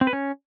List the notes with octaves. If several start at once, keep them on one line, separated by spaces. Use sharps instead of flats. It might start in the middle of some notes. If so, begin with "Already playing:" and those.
C4
B4
C#4